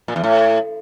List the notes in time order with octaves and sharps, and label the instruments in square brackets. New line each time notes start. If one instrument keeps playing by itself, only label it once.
[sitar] A#2
E2
A2